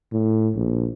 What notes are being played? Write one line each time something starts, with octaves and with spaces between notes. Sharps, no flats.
A2
A#1